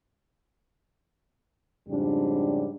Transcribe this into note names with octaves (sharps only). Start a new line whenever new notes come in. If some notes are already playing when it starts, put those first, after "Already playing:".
F2 G#2 C#3 G3 D4